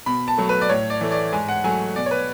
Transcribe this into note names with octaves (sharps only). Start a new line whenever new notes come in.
B2 B5
A5
F#3 A3
B4
D5
A2 C#5
D5
E3 A3
D5
G#2 G#5
F#5
F#3 A3 G#5
B2 D5
C#5
B4